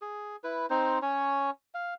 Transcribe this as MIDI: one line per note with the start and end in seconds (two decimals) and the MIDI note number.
0.02 0.36 68
0.44 0.66 64
0.44 0.66 71
0.70 0.99 60
0.70 0.99 63
0.70 0.99 72
1.02 1.50 61
1.02 1.50 73
1.74 1.94 77